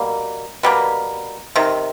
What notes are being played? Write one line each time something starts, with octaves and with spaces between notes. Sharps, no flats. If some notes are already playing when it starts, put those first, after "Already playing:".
Already playing: B2 G3 A#3
B2 G3 A#3
C3 D#3